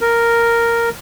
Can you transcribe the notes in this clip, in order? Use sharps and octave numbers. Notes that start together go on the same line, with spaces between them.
A#4